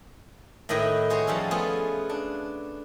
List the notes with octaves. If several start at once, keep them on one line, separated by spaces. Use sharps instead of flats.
A2 D#3 E4 B4 D#5 G5
F#4 G#4 C5 C#5
F3 G3 C#4 A4
A3 B3 F4 G#4 A4
D4